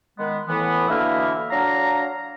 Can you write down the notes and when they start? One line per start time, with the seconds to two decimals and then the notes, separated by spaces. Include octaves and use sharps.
0.18 D#3 G#3 B3
0.47 A2 E3 B3
0.88 B2 D3 A#3 E4 E5 F6
1.51 F#3 D4 F5 A#5